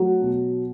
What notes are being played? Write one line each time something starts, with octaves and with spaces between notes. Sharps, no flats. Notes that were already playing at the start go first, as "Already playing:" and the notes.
Already playing: F#3 A3 F#4
B2